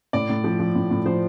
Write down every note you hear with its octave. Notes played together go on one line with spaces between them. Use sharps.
A2 D5
A2
F3
F3
A2
A2
F3 C5